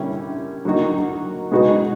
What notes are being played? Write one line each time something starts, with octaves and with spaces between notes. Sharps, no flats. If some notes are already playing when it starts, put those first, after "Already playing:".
Already playing: D3 G3 A#3 C#4 E4
D3 F#3 A#3 D#4 F#4
B2 G#3 B3 D#4 F#4